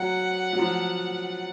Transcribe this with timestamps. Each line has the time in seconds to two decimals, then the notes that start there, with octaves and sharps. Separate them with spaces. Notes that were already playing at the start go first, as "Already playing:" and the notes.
Already playing: F#3 F#5
0.53 F#3
0.59 F3